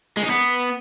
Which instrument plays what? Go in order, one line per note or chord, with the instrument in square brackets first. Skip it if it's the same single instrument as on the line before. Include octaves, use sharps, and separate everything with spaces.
[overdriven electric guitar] G#3
D#4
B3